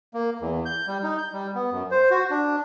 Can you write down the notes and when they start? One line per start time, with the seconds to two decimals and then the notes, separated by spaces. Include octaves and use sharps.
0.14 A#3
0.41 E2
0.66 G6
0.87 G3
1.03 D#4
1.18 G6
1.33 G3
1.55 B3
1.72 F#2
1.91 C5
2.11 F#4
2.30 D4